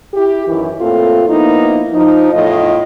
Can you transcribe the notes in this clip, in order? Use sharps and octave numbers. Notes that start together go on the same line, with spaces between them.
E4 G4
F#2 D#3 E3
A2 A#3 C4 F4 A4
F3 A#3 B3 D#4 E4
F3 D#4
E2 A2 F4 D#5